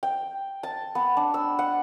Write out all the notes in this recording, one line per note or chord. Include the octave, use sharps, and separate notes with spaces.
G5
A5
B3
D4
E6
F#5